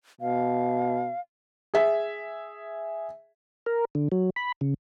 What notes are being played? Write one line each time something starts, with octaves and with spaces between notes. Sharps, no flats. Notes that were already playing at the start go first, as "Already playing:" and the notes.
B2 F5
G#4 E5
A#4
D3
F#3
B5
C#3